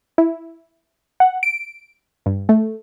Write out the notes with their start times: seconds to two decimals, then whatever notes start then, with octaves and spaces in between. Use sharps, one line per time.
0.18 E4
1.20 F#5
1.43 D7
2.26 G2
2.49 A3